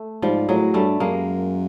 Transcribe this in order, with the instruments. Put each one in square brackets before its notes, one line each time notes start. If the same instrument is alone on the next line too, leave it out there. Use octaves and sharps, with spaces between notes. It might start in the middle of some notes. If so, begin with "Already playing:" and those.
Already playing: [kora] A3
[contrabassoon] G#2 [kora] F3 G3
[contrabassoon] A2 [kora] F#3 G#3
[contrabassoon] G2 [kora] G3 A3
[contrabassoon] F#2 [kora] G#3 A#3